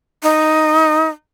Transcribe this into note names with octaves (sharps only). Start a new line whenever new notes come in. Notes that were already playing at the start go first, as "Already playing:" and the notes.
D#4